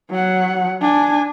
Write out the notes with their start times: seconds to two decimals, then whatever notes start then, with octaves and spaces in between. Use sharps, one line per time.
0.11 F#3 F#5
0.81 D4 G#5